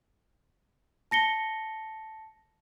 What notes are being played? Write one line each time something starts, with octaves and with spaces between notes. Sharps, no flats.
A5 A#6 C#7 G7